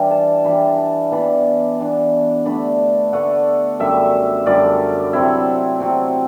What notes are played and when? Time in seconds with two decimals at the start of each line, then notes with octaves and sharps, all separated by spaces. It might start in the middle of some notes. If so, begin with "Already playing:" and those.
Already playing: E3 G3 D4
0.11 A5
0.45 E3 G3 D4 B5
0.78 A5
1.12 E3 B3 D4 B5
1.79 E3 B3 D4
2.45 D3 A3 D4 B5
3.12 D3 A3 D4 F#5
3.79 F#2 D3 G3 E5
4.46 F#2 D3 G3 D5
5.13 C3 F#3 C4 E4
5.80 C3 F#3 C4